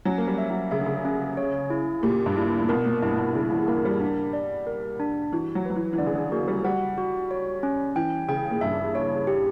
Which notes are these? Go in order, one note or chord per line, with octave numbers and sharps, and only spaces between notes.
F#3 C#4
A#3
G3
E5
F#3
C#3 E5
D3
C#3
C#4
C#5
E4
A#2 G4
G2
E4
A#2
B2 A#4
A#2
G2 E4
A#2
B2
C#3 E4
E3
A#3 A#4
G3
D4
D5
A#4
D4
E3 F#4
F#3
F#3 B4
E3
E3
D3 D5
C#3
D3
A#3 F#4
G3
G3 F#5
F#4
C#5
C#4
E3 G5
C#3 G5
A#2
G2 E5
C#5
G4